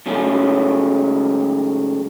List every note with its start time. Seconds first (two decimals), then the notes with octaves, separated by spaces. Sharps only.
0.06 G#2 C#3 F#3 A3 C#4